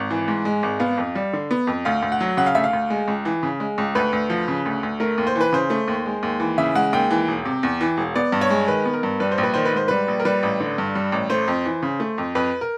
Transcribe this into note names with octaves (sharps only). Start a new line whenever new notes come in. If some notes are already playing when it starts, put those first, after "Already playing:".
Already playing: G#1
E3
G#2
G#3
G#1
B3 F5
F2
G3
D3
B3
F2
D2 F5
D2
F#5
F#3
C#3 F#5
F5
D2 E5
F5
D2
G#3
C#2
E3
C#3
G#3
C#2
D2 B4
D2
F3
C#3
D2
D2
A3 A#4
D#2
C5
E3 B4
C#3 C5
A3
D#2
G#3
D#2
E3
C#3 E5
G#3 F#5
D#2 G5
E3
E1
C3
E2
E3
E1
B3 D5
G2
C#5
G#3
D#3 B4
B3
A#4
G2
G3 B4
C5
A#1
B4
D#3 C5
B4
G#2 C5
G3 B4
A#1
A#4
G3 B4
A1
D3
G2
G3
A1
A3 C5
F2
E3
C#3
A3
F2
F2 B4
A#4